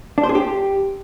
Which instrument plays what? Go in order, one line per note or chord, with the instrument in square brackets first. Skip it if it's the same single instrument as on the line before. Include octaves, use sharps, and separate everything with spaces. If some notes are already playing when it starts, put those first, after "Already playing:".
[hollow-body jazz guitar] D4
C5
G#4
G4